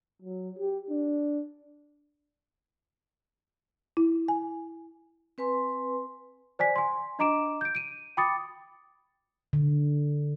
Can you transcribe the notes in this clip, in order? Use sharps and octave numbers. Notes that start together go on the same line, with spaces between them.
F#3
G4
D4
E4
G#5
C4 B4 G#5 C6
C5 D5 G#5 B6
G#5 C6
D4 D#5 A#5 D6 D7 E7
G6 D7
D7 D#7
G5 B5 D6 D#6 A6 C#7
D3